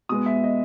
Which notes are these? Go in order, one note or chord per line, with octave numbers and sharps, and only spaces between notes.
B2 G#3 B3 D#6
E5
D#5